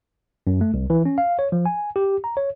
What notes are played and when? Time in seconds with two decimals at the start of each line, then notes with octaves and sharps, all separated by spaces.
0.47 F#2
0.61 A3
0.74 C2
0.90 E3
1.05 C#4
1.18 F5
1.39 C#5
1.52 F3
1.66 G#5
1.96 G4
2.24 A#5
2.37 C#5